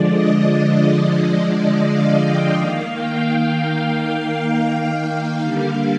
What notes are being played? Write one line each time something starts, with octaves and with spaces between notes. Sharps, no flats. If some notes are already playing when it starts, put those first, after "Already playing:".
Already playing: D3 F3 G#3 D5
D#5
F5
G5
D#3 A#3 F5
G5
G5
F5
D3 G3 A#3 F5